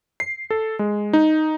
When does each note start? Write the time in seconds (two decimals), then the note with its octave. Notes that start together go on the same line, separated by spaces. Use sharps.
0.20 C7
0.50 A4
0.79 G#3
1.13 D#4